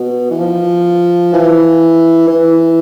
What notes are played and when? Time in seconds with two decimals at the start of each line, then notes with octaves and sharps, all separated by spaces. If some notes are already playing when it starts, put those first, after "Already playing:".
Already playing: B2
0.31 E3
0.40 F3
1.34 E3
2.28 E3